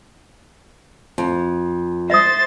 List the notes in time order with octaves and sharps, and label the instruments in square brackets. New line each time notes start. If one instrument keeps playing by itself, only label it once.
[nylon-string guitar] F2
[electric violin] C5 A6 [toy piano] E5 D#6